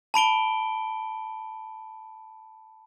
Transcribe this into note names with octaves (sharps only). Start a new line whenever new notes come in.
A5 B5 D7 G7